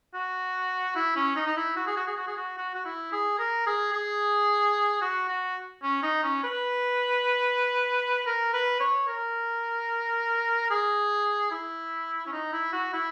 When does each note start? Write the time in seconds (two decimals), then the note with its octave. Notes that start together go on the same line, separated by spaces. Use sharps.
0.14 F#4
0.95 E4
1.16 C#4
1.36 D#4
1.46 D#4
1.57 E4
1.76 F#4
1.87 G#4
1.97 F#4
2.07 G#4
2.17 F#4
2.27 G#4
2.37 F#4
2.58 F#4
2.75 F#4
2.85 E4
3.12 G#4
3.39 A#4
3.66 G#4
3.93 G#4
5.01 F#4
5.28 F#4
5.83 C#4
6.03 D#4
6.23 C#4
6.44 B4
8.26 A#4
8.53 B4
8.80 C#5
9.08 A#4
10.70 G#4
11.51 E4
12.27 C#4
12.32 D#4
12.53 E4
12.72 F#4
12.93 E4